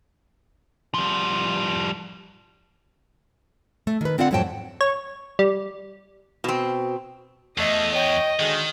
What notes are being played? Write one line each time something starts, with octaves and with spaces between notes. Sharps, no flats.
F3 G3
A3
D#3 B4
D3 C4 F4 D5 D#5 F#5
F2 G#2 F#3 C4 G5 A5
C#5
G3
B2 C4
E2 A3 D#5
C#5 D#5 G5
D3 D#3 G#3 F#4